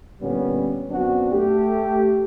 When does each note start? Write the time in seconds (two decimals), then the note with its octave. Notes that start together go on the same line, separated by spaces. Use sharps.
0.21 A#2 D3 G3 B3 C#4
0.88 F#2 B3 C4 D4 F#4
1.31 A3 G4